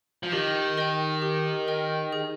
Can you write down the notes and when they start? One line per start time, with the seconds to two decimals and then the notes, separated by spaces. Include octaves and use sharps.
0.23 F3
0.32 D#3 G4
0.77 A#4 D#5 G5
1.22 G4
1.68 A#4 D#5 G5
2.13 G#4